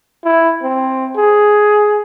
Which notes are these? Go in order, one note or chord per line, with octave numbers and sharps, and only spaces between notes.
E4
C4
G#4